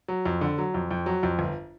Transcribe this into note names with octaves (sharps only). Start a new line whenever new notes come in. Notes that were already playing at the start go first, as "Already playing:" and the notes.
F#3
F2
D3
F#3
F2
F2
F#3
F2
G1